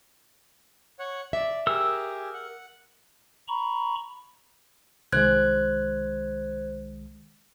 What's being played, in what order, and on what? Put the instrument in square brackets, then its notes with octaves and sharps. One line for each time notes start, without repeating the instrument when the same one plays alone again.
[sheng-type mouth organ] C#5 F#5
[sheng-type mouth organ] D5 [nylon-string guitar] E5
[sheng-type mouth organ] G4 G#4 [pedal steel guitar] A#4 E6
[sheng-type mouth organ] F#5
[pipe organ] A#5 B5 C#6
[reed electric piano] C2 D#3 G#3 [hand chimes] C5 F#6 G#6